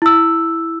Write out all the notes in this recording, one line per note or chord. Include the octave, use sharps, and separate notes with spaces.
E4 E6